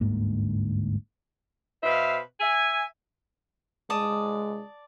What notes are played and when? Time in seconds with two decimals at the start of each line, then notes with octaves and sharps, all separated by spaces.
0.01 G1 D2 G#2 A#3
1.83 B2 B4 C5 E5 F5
2.40 E5 G#5
3.90 G#3 D5 A5 D#6